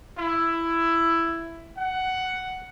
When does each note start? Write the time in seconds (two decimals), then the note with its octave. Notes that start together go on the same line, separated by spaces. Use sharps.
0.17 E4
1.77 F#5